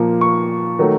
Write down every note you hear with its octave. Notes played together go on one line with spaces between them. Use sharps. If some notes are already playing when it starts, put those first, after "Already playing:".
Already playing: A#2 F3 A#3
C#6
D#3 F#3 A3